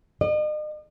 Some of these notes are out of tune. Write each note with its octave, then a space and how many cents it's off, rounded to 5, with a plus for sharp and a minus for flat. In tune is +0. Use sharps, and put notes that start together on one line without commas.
D#5 -40